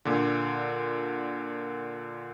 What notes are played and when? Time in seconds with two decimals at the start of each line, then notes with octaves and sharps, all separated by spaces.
0.05 A#2 D3